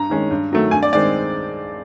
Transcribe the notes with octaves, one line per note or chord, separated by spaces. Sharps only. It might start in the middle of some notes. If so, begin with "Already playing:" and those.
Already playing: G2 A#5
D#3 G#3 C#4
G2
D#3 F#3 A3
G2 G#5
D5
D#3 G#3 C4 D5